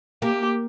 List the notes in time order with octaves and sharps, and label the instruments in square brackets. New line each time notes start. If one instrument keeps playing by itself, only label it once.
[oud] A#3 [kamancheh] G4